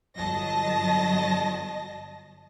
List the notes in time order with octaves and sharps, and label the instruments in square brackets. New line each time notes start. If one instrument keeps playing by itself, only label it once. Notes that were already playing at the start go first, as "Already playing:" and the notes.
[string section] G1 F#3 D#5 A5 A#6